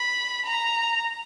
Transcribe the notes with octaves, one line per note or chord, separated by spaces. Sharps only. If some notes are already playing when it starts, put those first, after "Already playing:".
Already playing: B5
A#5